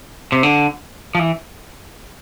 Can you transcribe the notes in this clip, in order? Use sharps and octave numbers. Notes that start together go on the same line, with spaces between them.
C3
D3
F3
E3